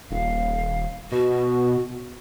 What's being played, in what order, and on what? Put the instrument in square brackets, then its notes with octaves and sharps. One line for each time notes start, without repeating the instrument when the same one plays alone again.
[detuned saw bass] D#1 [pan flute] F5
[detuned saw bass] B2 [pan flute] F#4